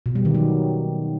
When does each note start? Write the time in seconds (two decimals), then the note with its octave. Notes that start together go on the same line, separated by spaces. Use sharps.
0.06 B2
0.15 G3
0.25 D#3
0.35 F#3